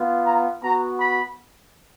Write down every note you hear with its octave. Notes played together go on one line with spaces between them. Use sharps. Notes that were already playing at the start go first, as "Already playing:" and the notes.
Already playing: B3 F4
A#5
B3 F#4 A#5
B5